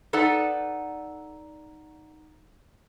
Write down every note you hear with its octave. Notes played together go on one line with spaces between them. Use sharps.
D#4 A4 B4 D5 F#5